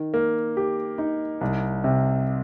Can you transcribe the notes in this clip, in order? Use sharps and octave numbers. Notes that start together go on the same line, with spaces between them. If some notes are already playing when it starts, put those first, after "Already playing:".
Already playing: D#3
A#3
G4
D#4
C2
C3